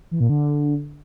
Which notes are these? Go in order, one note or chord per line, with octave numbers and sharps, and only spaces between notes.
E3
A#2
D3